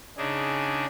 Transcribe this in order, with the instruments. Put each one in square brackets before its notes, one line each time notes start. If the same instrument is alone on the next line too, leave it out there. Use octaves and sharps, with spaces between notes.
[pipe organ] C#3 D4 D#4 G#4